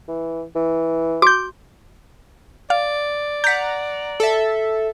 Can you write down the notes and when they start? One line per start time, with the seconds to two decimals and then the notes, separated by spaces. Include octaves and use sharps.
0.08 E3
0.55 E3
1.22 F#4 D6 G6
2.70 D5 F5
3.44 F#5 A#5 G6 B6
4.20 A4 E5